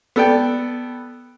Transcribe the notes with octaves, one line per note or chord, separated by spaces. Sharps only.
B3 A4 D5 G5